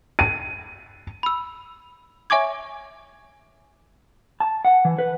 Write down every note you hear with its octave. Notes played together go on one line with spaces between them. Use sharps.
D#7
B5 E6
C#5 E5 G#5 C#6 D6 G#6
A5
F#5
E3
B4